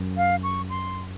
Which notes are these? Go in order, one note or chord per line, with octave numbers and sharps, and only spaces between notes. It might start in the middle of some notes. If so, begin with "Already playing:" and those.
Already playing: F#2
F5
C#6
C6